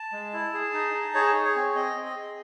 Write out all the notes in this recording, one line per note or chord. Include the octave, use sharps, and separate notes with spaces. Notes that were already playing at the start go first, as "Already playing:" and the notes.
Already playing: A5
G#3
E4
G#4
D#4
D#4
G#4 C#5
G#4
C#5
C4
C4 D#5
C4
D#5
G#4